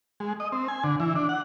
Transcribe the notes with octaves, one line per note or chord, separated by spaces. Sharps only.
G#3
D#5
C4
G#5
D3
E3
D4
F#5